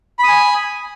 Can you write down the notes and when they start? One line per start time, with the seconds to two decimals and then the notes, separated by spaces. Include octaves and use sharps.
0.19 B5
0.24 D#6
0.28 G#5